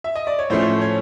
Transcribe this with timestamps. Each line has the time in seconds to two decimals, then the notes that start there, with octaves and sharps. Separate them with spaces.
0.04 E5
0.16 D#5
0.27 D5
0.39 C#5
0.50 A2 F3 A3 C#4 C5
0.82 C#5